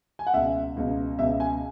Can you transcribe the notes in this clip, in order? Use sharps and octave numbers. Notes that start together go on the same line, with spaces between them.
G#5
F#5
C#2 B2 E5
C#2 B2
C#2 B2 E5
G#5